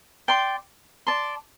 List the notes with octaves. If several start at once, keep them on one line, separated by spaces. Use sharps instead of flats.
D5 G5 C6
D5 A5 C6